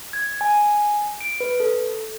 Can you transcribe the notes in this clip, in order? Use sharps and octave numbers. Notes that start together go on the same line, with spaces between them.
G#6
G#5
D7
B4
A4